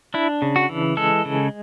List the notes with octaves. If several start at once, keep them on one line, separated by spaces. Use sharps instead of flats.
D4 E4
C#3
F#4
E3
G#3 A4
C#3